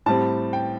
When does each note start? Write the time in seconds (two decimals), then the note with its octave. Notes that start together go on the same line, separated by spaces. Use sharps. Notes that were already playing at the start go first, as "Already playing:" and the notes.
0.06 A2 G3 C4 A5
0.53 G5